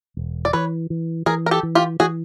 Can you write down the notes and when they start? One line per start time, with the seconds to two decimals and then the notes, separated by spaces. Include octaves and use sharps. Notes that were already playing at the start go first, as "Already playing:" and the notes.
0.17 E1
0.45 D5
0.53 E3 B4 C#5
0.90 E3
1.26 E3 G#4 A#4
1.46 A#4
1.51 G4 A4
1.63 E3
1.75 F4 G4
2.00 E3 F#4 G#4